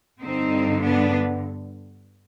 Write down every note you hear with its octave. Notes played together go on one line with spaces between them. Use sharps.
G2 D3 C4 D#4
B3 D4